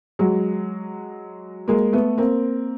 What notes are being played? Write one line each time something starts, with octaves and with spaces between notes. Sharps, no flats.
F#3 G#3
G#3 A#3
A3 B3
A#3 C4